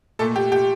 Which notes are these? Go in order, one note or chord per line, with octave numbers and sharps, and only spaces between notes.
A#2 A3 A4
G4
G4